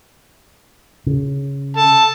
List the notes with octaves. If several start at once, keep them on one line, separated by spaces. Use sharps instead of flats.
C#3
A4 A5